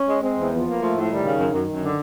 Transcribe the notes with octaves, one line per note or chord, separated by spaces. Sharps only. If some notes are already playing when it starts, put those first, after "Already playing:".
Already playing: C#4
G#3
G#3 C4
E2
F3 B3
A#3
F3 A3
A2
D#3 G3
C#3
F#2
F#2
F#2
D3